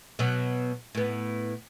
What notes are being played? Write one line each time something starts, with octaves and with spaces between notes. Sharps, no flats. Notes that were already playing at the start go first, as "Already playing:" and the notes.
B2 F#3
A2 B3